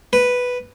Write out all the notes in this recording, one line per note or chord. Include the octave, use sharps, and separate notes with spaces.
B4